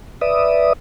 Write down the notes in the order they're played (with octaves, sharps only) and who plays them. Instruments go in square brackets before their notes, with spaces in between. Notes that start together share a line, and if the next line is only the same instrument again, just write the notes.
[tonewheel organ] B4 D5 E5 D#6